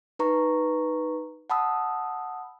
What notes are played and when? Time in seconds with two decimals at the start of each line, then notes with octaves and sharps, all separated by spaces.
0.19 D#4 B4 A#5 C#6
1.50 F#5 A5 B5 D#6 E6